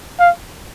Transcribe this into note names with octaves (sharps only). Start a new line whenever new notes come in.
F5